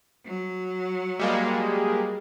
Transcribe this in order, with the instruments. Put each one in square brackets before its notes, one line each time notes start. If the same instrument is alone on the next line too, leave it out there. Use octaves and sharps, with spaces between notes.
[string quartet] F#3
[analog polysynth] G3 G#3 A#3